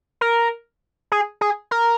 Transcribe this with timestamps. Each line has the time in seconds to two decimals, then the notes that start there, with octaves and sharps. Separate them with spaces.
0.21 A#4
1.12 G#4
1.41 G#4
1.71 A#4